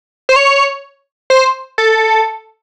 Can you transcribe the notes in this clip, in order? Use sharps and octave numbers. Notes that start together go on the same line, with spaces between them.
C5
C#5
C5
A4